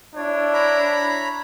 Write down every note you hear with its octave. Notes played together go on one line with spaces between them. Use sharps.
D4 E4 C#5
C#5 A#5 B5